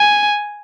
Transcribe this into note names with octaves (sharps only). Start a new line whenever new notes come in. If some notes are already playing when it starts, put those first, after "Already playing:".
Already playing: G#5